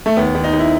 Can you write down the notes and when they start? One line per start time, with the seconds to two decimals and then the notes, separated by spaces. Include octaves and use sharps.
0.06 A3
0.17 D#2 B3
0.35 D#2
0.44 D#4
0.53 D#2
0.59 E4